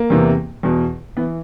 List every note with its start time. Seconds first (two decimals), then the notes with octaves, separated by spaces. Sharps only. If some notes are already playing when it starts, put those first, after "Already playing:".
Already playing: A#3
0.10 E2 C3 E3
0.63 E2 B2
1.17 E3 B3